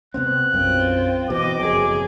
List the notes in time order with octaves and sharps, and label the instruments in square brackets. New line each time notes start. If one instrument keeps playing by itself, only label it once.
[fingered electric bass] C3 B3 C4 [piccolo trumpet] F#6
[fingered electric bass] B1 F#2 [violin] C4 F4
[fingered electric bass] B2 E3 [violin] C4 D#5 [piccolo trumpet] D6
[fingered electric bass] F#1 F2 F#3 [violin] G#4